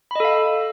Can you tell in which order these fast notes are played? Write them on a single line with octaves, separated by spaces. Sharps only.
B5 D#5 A4 F5